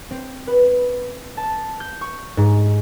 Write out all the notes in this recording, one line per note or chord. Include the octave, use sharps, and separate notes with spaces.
C4
B4
A5
G6
C#6
G#2